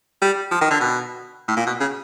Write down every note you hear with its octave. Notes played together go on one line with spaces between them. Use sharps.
G3
F3
D#3
D3
B2
A2
A#2
B2
C#3